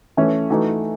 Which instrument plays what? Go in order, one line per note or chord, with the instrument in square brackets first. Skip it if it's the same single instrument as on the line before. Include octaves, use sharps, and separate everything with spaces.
[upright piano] E3 A3 C#4 E4
E3 A3 D#4 F#4